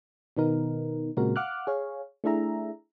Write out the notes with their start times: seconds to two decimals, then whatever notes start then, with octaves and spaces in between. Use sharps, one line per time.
0.37 B2 D#3 B3 D#4 A#4
1.17 A#2 C#3 G#3 C4 F#4 A#4
1.36 F5 F#5 D6 F6 F#6
1.67 G#4 C#5 F5
2.24 A3 D4 E4 G#4 E5 A#5